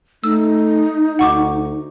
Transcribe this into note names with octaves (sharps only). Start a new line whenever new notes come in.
A3 D#4 E6
D2 F#5 C#6 D6